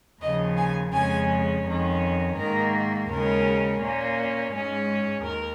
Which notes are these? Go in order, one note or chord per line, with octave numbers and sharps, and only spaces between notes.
D#2 C#3 F3 D#5
G#5
F2 C#3 G#3 C#4 G#5
F2 D#3 C#4
G#2 D#3 A#3 A#4
D#2 C#3 G#3 C#4 A#4
A#2 A#3 C#4
G#2 G#3 C#4
D#2 A#4